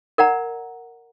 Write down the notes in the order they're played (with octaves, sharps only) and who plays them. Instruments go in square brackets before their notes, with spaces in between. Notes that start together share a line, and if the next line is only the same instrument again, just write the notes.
[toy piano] A#4 D5 F#5 A#5